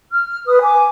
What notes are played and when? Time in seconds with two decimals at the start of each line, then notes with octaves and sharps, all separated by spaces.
0.12 F6
0.46 B4 D#6
0.62 G#5 D6